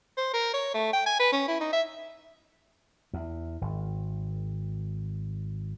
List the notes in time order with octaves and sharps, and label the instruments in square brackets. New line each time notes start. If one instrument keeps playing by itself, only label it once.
[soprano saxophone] C5
A#4
C#5
A3
G5
G#5
B4
C#4
E4
D#4
E5
[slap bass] E2
G#1